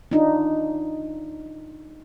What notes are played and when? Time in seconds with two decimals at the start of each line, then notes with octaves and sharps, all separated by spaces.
0.11 D4 D#4 F4